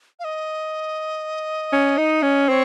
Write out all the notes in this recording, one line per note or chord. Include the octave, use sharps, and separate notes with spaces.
F5
D#5
C#4
D#4
C#4
C4 C#5